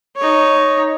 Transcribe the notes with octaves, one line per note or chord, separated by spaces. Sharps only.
D#4 C#5